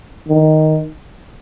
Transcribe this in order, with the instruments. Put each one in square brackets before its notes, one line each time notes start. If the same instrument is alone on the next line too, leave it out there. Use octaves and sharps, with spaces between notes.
[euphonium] D#3